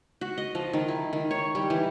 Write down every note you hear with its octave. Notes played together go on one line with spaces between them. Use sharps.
F#4
D#5
F3
D#3
E4
D#3
C#5
G3
E3